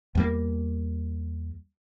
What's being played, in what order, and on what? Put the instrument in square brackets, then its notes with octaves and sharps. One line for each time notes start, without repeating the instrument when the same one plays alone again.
[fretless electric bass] E2 G3 A#3